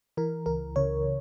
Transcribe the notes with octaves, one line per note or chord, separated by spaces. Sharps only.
E3 A#4
C#2 A#4
C#3 C#5